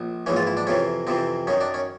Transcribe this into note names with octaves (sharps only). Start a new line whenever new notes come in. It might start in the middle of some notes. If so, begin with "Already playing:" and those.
Already playing: A#1
A#1 G#2 E3 C#4
F4
E4
D4
F2 C3 E3 C#4
F2 C3 E3 C4
F#2 D#3 C#4
D4
C#4